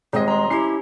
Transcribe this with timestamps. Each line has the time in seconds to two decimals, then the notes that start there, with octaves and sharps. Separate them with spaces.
0.13 D#1 G#3 C4 D#5
0.28 A#5 C6
0.50 C#4 E4 G4 C7